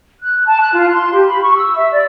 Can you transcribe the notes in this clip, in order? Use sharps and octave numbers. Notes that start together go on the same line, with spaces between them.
F#6
A5
F#6
F4
C6
G4
B5
C#6
E6
E5
D5